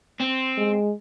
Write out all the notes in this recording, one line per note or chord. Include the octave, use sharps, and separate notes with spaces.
C4
G#3